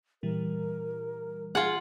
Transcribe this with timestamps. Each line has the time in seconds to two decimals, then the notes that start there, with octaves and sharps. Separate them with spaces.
0.23 A#2 E3 G3 A#4
1.55 F4 G#4 F#5